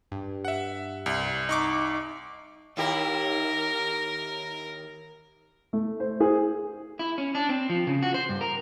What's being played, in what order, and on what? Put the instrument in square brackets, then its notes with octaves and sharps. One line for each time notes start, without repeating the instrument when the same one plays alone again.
[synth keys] G2
[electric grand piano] E5 F#5
C2
[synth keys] D#4 C#6 D6
[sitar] D#2 E4 G4 [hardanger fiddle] A#4
[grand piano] A3
C5
G#4
[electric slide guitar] E4
C#4
D4
C4
F3
C#3
F#4
C5
G2
A#4